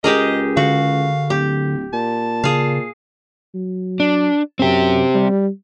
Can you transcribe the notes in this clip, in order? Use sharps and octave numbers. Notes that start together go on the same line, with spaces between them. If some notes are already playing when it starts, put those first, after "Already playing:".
C#2 G4 G#4 A#4 D#5
D3 F#4 F5
D1 G4
A#2 A5
C#3 G#4 F5
F#3
D4
F#2 C4 G4
G3